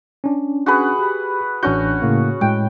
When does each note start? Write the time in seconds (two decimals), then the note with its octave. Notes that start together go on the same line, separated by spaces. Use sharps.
0.24 C#4 D4
0.66 F#4 G#4 B4
0.99 G4 B5
1.63 A1 C#4 D4 F#4 G6
2.02 A2 C#3 A#3
2.41 A2 G#3 G5